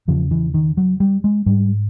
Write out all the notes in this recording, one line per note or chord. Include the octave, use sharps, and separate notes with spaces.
E2 C#3 F3
E3
D#3
F#3
G3
G#3
G#2 G3